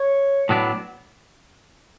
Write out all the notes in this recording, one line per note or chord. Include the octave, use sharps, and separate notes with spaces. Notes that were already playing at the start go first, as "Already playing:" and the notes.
Already playing: C#5
A2 F#3 B3 D4